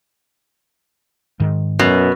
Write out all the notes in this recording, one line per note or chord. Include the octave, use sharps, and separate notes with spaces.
G#2 D#3
F#2 B2